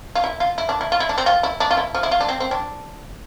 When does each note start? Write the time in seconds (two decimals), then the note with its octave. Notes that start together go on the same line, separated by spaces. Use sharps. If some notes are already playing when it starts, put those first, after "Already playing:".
0.15 F4
0.24 E4
0.40 F4
0.58 E4
0.69 D4
0.81 E4
0.92 F4
1.00 E4
1.09 D4
1.18 C4
1.26 F4
1.43 E4
1.60 D4
1.71 F4
1.77 E4
1.95 F3
2.03 E4
2.11 F4
2.21 D4
2.28 C4
2.40 C4
2.51 D4